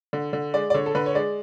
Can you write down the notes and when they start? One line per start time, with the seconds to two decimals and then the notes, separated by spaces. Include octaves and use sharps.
0.13 D3
0.33 D3
0.54 G#3 D5
0.70 D5
0.74 D3 C#5
0.86 A4
0.95 D3 B4
1.06 C#5
1.15 G#3 D5